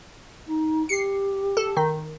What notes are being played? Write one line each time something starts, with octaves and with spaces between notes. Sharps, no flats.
D#4
G4 C7 C#7
A4
D#3